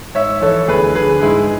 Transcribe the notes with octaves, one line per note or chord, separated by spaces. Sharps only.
G#2 C#5 E5
E3 A4 C#5
D2 G#4 B4
D3 G#4 B4
G#2 E4 G#4